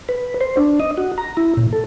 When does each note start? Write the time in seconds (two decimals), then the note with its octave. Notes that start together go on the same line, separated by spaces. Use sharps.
0.09 B4
0.41 C5
0.57 D4
0.80 D#5
0.98 F#4
1.18 A#5
1.37 E4
1.57 A#2
1.73 A4